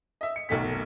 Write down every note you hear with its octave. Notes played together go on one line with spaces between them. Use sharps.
D#5 E5
C#7
F1 B1 D#3 A3 B6